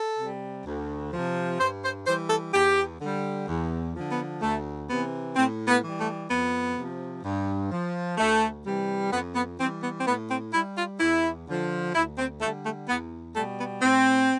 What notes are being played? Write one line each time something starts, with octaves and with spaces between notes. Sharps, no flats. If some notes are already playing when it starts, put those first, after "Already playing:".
Already playing: A4
C3 G3
D2
C3 F3
G2 C5
C5
E3 G3 C5
A4
E2 G4
D3 G3
E2
D3 F3
B3
D2 A3
C3 E3 B3
A2 C4
B3
E3 G3
A3
F2 B3
C3 F3
G2
F3
D2 A3
C3 E3 G3
F2 B3
B3
E3 G3 C4
B3
C4
A2 B3
C4
G3 E4
F4
E2 E4
D3 F3
D2 E4
C4
D3 G3 A3
A3
E2 B3
B2 G3 A3
B3
A2 C4